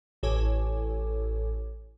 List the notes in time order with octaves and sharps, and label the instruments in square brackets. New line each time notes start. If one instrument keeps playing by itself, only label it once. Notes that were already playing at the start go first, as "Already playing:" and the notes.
[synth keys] A1 A4 C#5 G#5 D6